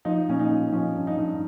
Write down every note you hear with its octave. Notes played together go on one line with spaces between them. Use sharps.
F3 D#4
A#2 C#4
D#4
F3
F3 C#4
G2
D#4
G2